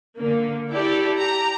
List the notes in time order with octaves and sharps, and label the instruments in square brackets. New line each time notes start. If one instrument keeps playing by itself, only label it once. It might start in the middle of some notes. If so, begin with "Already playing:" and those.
[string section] D3 A#3
E4 G4 A4 D5
G4 A#5